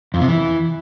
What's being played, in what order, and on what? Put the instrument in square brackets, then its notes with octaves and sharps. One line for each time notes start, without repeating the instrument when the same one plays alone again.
[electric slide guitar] F2
C3
E3